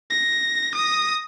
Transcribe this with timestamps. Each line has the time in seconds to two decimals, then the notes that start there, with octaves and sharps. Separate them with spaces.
0.10 A#6
0.75 D#6 A#6